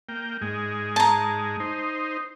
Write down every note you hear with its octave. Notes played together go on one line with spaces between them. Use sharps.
A#3 G5
G#2 G#3
A5 A#5
D#4 C5